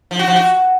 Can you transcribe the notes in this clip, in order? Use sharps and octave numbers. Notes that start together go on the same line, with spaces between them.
F3
F#4
F3
F#4